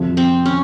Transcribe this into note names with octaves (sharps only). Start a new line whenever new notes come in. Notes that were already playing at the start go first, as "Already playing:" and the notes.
Already playing: F2 C3 F3
C4
C#4